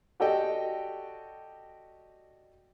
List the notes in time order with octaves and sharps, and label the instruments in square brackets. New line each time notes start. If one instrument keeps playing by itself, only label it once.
[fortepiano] F#4 G4 A4 D5 D#5 G5